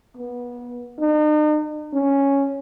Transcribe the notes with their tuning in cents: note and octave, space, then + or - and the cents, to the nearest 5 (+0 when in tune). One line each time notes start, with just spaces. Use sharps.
B3 -25
D#4 -45
C#4 +0